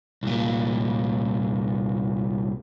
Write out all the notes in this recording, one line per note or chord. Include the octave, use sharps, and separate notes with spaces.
C2 A#2